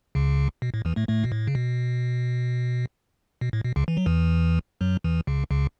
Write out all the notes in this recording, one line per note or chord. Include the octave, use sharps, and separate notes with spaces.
C#2 C#3
B2
A2
E2 E3
A2 A3
A2 A3
B2
A2
C#3
B2
B2
A2
B2
C#2 C#3
E3
F#3
E2 E3
F#2 F#3
E2 E3
C#2 C#3
C#2 C#3